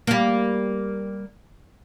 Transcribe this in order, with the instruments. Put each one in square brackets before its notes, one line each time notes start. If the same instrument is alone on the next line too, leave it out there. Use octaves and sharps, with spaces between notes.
[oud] G3 A#3